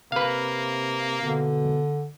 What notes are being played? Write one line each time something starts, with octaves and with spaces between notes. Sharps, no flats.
C3 A#3 B4 F5
B2 D3